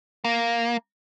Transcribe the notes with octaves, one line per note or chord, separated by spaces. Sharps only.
A#3